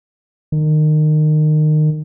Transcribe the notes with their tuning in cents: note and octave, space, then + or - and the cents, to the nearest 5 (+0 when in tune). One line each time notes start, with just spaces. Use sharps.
D#3 -25